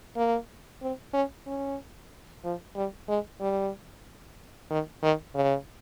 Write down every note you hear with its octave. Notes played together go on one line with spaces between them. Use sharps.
A#3
C4
C#4
C#4
F3
G3
G#3
G3
D#3
D#3
C#3